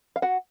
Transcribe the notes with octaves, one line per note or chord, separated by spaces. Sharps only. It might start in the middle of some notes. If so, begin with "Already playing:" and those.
F5
F#4 F#5